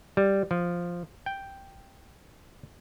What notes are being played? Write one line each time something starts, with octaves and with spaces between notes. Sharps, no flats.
G3
F3
G5